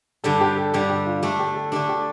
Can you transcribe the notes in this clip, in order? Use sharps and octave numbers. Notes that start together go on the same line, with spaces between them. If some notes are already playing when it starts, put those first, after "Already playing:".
G2 D3 G3 A4
G4
A4
G2 D3 G3 G4
G4
F4
D3 A3 D4 G4
G4
A4
D3 A3 D4 G4
G4